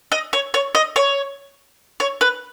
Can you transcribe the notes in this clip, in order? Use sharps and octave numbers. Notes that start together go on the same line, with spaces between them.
D#5
C#5
C#5
D#5
C#5
C#5
B4